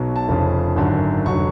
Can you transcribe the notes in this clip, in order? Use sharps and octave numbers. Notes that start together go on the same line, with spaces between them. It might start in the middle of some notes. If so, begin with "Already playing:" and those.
Already playing: B1 B2 F#3
A5
F1 F2 C#3 F3
G#1 F#2 D3 F#3
F1 D3 F#3 C#6